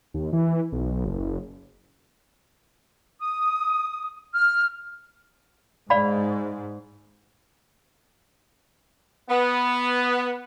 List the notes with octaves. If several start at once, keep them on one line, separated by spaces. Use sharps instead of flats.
D#2
E3
B1
F#1
D#6
F6
G#2 D5 F5 B5
B3